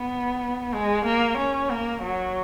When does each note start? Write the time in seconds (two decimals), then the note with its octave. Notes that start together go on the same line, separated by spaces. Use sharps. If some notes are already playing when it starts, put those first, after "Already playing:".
Already playing: B3
0.73 G#3
1.05 A#3
1.38 C#4
1.70 A#3
2.02 F#3